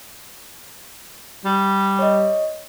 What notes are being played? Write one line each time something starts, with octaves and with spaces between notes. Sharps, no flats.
G3
C#5 D#5